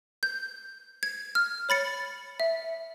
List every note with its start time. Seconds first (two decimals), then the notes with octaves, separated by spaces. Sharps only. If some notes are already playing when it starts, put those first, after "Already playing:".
0.23 G6
1.03 G#6
1.35 F6
1.69 C#5 B5 A6 C#7
2.40 E5